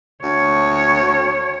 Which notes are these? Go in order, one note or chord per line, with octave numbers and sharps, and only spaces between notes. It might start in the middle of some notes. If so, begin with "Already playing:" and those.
D2 C#5